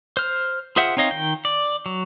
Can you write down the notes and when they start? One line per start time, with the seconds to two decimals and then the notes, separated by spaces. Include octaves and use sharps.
0.17 C5 F6
0.76 F4 G#4 C5 E5 F#5
0.97 C4 D#4 C#5 D#5 F5
1.11 D#3 G5
1.45 D5
1.86 F#3